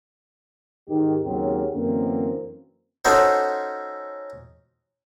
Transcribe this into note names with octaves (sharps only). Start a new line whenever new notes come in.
G#2 D#3 G4
D#2 C#3 F#3 C4 G4 A#4
F#2 D3 E3 A#3 C4
C#4 D#4 F#4 A4 C5